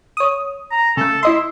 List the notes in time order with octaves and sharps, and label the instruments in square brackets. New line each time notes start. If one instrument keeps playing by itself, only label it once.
[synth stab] C#5 D#6
[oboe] A#5
[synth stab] C#3 A3 [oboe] A4
[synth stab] E4 D#5 C6 [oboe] E5